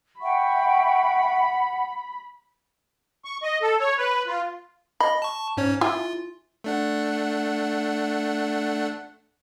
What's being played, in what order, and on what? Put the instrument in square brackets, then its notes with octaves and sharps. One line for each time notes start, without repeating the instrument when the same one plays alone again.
[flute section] E5 G5 C#6 [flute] F#5 [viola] B5
[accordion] C#6
D#5
A4
C#5
B4
F4
[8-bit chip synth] D#5 [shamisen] B5
[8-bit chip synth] A5 C#6
G#2 C#4 C#5
[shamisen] E4 G#5 [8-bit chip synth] F4
[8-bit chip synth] A3 D4 F#5